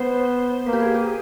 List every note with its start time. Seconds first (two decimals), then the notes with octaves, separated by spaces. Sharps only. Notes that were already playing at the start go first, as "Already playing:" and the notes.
Already playing: B3 C5
0.66 A#3 B4
0.73 G4
0.80 G#4
0.94 G4